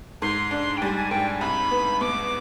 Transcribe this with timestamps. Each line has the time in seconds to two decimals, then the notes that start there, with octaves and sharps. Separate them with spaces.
0.22 G#2 C6
0.51 D4
0.77 G5
0.81 G3 G#5
0.96 G#5
1.11 G#2 G5
1.27 G#5
1.41 C2 B5
1.71 B3
2.01 B2 D6